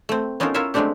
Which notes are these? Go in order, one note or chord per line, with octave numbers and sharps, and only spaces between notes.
A3 C4
B3 C#4 D#4 F4 A4 A#4
E4 F4 A#4 C#5 E5 F5
F#3 G#3 A3 C4 D4 G4